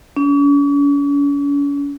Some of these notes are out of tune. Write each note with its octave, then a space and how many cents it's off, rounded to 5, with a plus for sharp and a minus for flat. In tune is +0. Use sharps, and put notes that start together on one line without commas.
C#4 +40